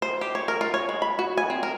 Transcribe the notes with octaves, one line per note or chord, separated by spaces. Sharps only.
C5
G4
C#5
A#4
F4
C#5
G#3
B5
F#4
G#5
C4
A#4